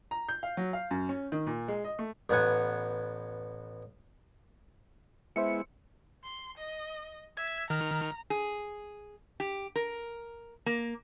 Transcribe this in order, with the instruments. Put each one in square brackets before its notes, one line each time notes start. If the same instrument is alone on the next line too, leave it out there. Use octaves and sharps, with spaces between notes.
[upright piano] A#5
G6
F5
F#3
F5
F#2
C#4
D#3
A#2
G#3
D#5
A3
[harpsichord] A1 B3 F#5 G#5
[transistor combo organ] G#3 B3 E4 [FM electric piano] C5 E5 C#7
[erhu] C6
D#5
[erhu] E5 [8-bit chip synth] G#6
[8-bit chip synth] D#3 F6 [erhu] A#5
[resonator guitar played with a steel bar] G#4
G4
A#4
A#3